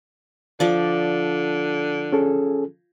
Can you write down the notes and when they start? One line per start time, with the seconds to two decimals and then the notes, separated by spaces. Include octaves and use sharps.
0.60 D3 F3 D5
2.13 C#4 G#4 A4